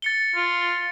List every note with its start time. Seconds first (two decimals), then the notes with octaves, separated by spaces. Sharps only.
0.02 A6 C#7 G7
0.35 F4